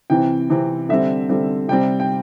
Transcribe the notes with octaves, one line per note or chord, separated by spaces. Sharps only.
C3 E3 C4 G5
C3 E3 C4
D3 G3 C4 E5
D3 G3 C4
C3 G3 C4 G5
G5